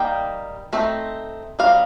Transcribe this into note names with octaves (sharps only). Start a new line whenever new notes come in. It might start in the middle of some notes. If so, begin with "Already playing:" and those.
Already playing: G3 A#3 D#4 G5
A3 C4 D#4
G3 C4 D#4 F5